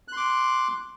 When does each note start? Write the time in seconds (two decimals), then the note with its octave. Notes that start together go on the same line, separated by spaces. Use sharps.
0.08 F#6
0.13 C6
0.17 D6